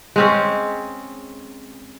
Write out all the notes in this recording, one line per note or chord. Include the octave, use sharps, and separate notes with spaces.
G#3 C4 C#4